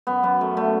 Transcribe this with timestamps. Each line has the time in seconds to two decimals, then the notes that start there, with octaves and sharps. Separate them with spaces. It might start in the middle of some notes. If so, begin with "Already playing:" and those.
0.07 F#2 B3
0.23 F#2 B3
0.41 F#2 A3
0.57 D3 A3